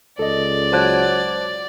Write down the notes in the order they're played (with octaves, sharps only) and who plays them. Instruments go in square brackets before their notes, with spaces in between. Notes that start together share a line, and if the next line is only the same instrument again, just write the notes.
[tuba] C#2 [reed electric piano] A4 D#5 [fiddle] D5
[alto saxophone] F#3 [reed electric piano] C5 A5 F#6